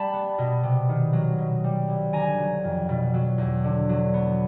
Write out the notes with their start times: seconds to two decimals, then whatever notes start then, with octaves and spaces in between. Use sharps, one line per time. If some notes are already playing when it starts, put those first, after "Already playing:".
Already playing: G3 A5 B5
0.13 B3
0.38 B2
0.63 C3
0.89 D#3
1.13 F#3
1.38 B2
1.64 G3
1.88 C2
2.13 D3 G#5 A#5
2.38 F#3
2.64 F2
2.89 B2
3.14 F#3
3.38 E2
3.64 D3
3.89 F#3
4.14 B3